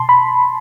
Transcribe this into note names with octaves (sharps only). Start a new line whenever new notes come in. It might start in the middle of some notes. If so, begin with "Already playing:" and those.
Already playing: B2 A5 C6
B5